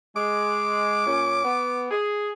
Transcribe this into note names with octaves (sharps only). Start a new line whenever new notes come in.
G#3 D6
A#2 C#4
B3
G#4